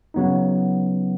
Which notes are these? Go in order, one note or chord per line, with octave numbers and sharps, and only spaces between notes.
C#3 F#3 B3 D#4